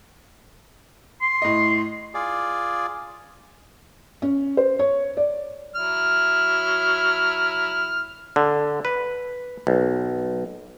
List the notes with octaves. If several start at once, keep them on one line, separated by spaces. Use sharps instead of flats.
C6
A2 D#5
F4 G#4 D5
C#4
C5
C#5
D5
F#3 E4 F6
D3
B4
B1